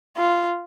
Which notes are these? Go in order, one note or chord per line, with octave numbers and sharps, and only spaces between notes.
F4